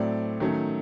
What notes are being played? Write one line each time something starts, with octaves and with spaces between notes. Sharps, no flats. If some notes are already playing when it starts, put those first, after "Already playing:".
Already playing: A2 F#3 A3 C4 D5
D#3 F#3 A3 C#4